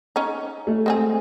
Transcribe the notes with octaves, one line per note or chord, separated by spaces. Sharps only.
C#4 D#4
A3
G#3 C4 G#4